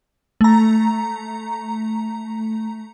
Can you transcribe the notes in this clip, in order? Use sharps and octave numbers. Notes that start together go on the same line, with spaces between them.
A3 A#5